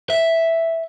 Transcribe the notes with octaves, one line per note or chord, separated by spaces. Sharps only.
E5